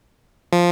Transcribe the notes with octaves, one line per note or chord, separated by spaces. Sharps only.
F3